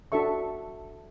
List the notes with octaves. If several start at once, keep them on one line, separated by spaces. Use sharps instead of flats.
D4 F#4 A4 E5 C#6